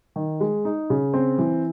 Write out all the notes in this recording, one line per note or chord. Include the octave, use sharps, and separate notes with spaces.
D#3
G#3
D#4
C#3
C4
E3